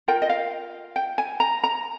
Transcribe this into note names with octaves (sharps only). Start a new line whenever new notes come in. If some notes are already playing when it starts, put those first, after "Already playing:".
F4 A#4 G5
D#5
F5
G5
G#5
A#5
A#5